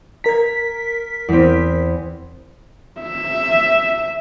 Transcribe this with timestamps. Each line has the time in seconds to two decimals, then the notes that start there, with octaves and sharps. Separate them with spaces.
0.24 A#4 A#5 G#6 B6
1.28 E2 C4
3.01 E5